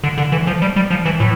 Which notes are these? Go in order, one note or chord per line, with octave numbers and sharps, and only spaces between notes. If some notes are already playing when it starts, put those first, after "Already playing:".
D3
D3
E3
F3
G3
G3
F3
E3
A2